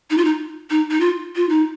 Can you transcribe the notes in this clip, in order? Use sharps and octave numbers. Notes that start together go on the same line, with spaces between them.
D#4
F4
D#4
D#4
D#4
F4
F4
D#4